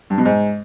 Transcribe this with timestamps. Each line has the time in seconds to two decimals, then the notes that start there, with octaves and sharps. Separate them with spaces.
0.10 G2
0.18 B2
0.25 G#2